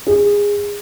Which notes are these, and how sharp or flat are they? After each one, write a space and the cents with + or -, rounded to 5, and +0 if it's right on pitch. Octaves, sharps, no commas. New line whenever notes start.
G#4 -20